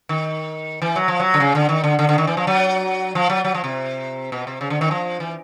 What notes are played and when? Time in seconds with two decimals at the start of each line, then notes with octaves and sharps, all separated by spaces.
0.09 D#3
0.82 E3
0.96 F#3
1.08 F3
1.20 F#3
1.34 D3
1.40 C#3
1.55 D3
1.69 D#3
1.84 D3
1.99 D3
2.09 D3
2.18 D#3
2.27 E3
2.37 F3
2.47 F#3
3.15 F3
3.30 F#3
3.45 F#3
3.54 F3
3.64 C3
4.32 B2
4.47 C3
4.61 C#3
4.70 D3
4.81 D#3
4.91 F3
5.20 E3